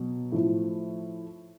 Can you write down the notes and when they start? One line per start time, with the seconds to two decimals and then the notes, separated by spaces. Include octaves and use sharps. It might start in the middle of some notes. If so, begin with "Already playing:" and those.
Already playing: B2 F#3
0.32 A2 F3